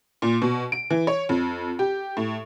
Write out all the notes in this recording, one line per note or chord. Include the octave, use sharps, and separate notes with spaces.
A#2
B2
D7
E3
C#5
F2
G4
A2